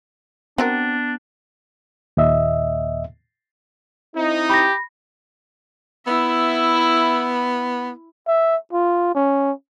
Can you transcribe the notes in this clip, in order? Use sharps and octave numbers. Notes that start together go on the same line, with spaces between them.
B3 C4 D4 F#4 A#4
D#2 A#2 D#5 E5
C4 D#4 E4
G4 B5 A#6
B3 E4 E5
E5
F4
C#4